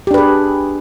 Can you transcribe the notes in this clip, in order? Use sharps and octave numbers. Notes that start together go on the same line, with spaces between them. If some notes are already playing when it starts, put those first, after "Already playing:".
D4 G4 G#4 B4